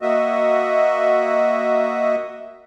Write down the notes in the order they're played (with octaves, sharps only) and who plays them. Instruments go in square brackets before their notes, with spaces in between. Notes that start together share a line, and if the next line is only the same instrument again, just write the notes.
[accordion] A#3 F#4 D#5 E5